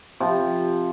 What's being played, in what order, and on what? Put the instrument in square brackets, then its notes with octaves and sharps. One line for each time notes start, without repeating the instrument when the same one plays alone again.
[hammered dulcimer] C3 F3